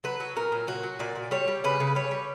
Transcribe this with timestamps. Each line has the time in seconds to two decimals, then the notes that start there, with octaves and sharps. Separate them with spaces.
0.04 F#3 B4
0.20 F#3
0.36 A#2 A#4
0.52 A#2
0.67 F#3 F#4
0.83 F#3
0.99 A#2 D5
1.16 A#2
1.31 G3 C#5
1.48 G3
1.64 C#3 B4
1.80 C#3
1.95 G3 C#5
2.11 G3